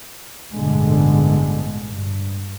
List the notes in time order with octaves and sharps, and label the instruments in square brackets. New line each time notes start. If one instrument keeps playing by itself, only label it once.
[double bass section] A1 G2 B2 D3 G#3
G2